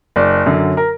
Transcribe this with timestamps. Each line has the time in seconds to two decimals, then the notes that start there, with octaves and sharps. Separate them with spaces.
0.16 F#1 D5
0.46 F#2 D3 F#3
0.77 A#4